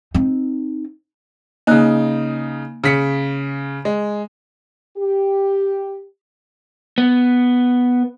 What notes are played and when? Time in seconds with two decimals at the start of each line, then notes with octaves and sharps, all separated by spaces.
0.14 C4 D#4
1.67 C#3 A#3 D#4 F#6
2.84 C#3 B6 C#7
3.85 G#3
4.97 G4
6.98 B3